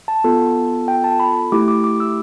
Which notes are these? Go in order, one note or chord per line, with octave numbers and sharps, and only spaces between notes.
A5
B3 F4 A4
G5
A5
B5
A3 E4 G4 D6
D6
D6
E6